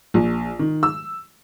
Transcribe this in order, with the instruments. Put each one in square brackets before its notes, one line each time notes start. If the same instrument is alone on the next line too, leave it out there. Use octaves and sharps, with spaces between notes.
[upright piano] A#1
D#3
E6